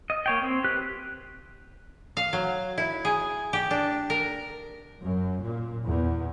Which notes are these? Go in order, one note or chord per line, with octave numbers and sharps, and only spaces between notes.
D#5
A#3 C#5 G5
C4
G4 B4 F#6
F5
F#3
E4
G#4
G4
D4
A#4
F#2
A#2
E2